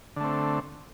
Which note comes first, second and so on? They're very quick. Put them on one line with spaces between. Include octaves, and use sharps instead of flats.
D3 A3 C4